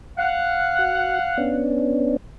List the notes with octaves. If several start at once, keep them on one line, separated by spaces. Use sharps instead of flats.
F5 F#5
F#4
B3 C#4 D4